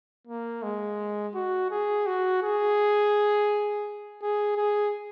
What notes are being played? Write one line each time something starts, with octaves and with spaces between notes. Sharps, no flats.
A#3
G#3
F#4
G#4
F#4
G#4
G#4
G#4